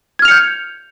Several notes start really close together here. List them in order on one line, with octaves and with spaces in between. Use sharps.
G#6 F6 F7 C#7 G6